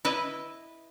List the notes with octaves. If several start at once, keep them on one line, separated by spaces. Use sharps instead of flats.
E4 B4 D#5